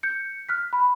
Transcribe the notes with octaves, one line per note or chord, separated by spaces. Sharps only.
G6 C#7
F6 F#6 B6
B5